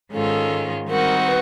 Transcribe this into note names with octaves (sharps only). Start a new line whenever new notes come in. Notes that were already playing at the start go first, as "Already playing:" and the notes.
G#2 D#3 G#3 C#4 F4 A4
D#3 G3 C4 D#4 F#4 A#4
B4